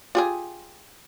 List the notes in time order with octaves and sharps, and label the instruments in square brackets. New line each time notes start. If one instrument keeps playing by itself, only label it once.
[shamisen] F4 G4 G#4